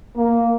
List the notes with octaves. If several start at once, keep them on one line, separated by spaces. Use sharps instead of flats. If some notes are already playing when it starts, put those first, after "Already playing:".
A#3